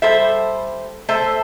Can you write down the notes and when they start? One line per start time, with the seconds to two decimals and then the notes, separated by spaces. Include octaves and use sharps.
0.02 G3 A4 C5 E5
1.08 A3 A4 C5 E5